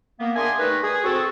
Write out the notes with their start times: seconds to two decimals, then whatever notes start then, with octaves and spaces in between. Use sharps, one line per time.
0.20 A#3 B3
0.36 D4 G#4 A#4 E5 G#5 C6
0.59 G3 A3 D#4 A#4 B4
0.82 G#4
1.04 C4 F#4 A4